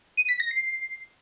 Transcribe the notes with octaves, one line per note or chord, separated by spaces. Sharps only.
D#7
B6
A#6
C7